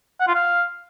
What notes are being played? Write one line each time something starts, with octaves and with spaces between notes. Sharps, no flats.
F#5
F4
F5